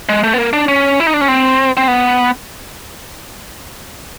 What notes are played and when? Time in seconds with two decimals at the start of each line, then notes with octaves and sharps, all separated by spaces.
0.09 G#3
0.24 A3
0.34 B3
0.38 A#3
0.53 D4
0.68 C#4
1.00 E4
1.07 D#4
1.14 D4
1.21 C#4
1.28 C4
1.77 C4
1.88 B3